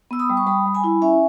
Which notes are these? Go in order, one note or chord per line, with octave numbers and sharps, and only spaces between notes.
B3 E6
B5 D#6
G3
C#6
G3 B5 D#6
G3
G#5 B5
E4
C#4 E5 G#5